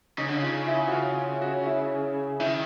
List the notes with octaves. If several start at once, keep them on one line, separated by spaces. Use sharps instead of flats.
C#3 D#4
D3
C#3
F4
E4
F#4
F4
F#4
E4
D#3 E4